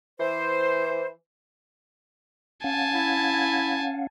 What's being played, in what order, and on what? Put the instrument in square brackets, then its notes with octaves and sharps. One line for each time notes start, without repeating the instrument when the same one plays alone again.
[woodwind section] E3 C5
[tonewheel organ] C#4 F5 F#5 [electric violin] G#5 A5
[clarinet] E4